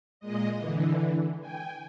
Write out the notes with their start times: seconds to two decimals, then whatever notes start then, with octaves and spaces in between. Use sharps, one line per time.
0.20 A#2 G#3 D#5
0.55 D3 E3
1.40 G5 G#5